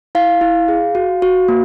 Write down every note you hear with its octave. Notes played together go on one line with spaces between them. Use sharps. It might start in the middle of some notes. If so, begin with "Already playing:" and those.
E4 F5
E4
G#4
F#4
F#4
A#3